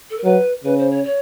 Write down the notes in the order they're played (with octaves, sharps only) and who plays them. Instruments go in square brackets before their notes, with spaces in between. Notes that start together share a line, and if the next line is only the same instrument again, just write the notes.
[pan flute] A4
A#4
[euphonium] F#3 [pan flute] B4
[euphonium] C#3 [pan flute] B4
[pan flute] C5
C#5
C#5